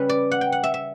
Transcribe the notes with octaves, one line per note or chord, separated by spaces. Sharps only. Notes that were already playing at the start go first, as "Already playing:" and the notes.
Already playing: C#3 G3 C#4 B4
D5
F#5
G5
F#5
E5
E5